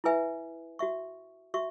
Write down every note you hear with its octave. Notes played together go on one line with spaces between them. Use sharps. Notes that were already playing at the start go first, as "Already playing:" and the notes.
E4 B4 E5 G#5
F#4 E5 C#6
F#4 E5 C#6